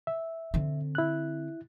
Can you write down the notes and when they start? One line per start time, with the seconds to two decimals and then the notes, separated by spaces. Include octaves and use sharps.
0.07 E5
0.54 D3 C4
0.95 E4 F#6